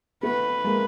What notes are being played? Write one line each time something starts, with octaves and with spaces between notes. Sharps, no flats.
A3 B3 B4
G#3 A#3